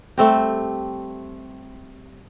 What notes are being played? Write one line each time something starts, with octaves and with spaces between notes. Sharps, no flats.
G3 A3 C4 G4